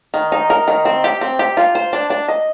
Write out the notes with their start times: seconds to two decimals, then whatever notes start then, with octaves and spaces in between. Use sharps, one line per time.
0.14 D#3
0.32 D#4
0.50 A#4
0.68 D#3
0.85 C4
1.04 G4
1.21 C4
1.39 G4
1.57 F4
1.75 C5
1.93 D4
2.10 D4
2.29 D#5